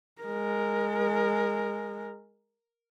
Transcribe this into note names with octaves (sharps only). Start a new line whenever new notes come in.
G#3 A#4